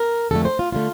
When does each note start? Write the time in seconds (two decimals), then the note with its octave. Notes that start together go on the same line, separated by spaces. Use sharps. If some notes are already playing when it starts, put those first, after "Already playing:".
Already playing: A#4
0.31 F2 D3 A3 A4
0.45 C5
0.59 F4
0.72 D3 A3 F4